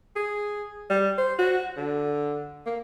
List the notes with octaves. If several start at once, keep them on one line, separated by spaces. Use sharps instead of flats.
G#4
G3
C5
F#4
D3
A#3